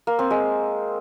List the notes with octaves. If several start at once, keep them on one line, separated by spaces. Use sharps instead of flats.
A#3
C4
G#3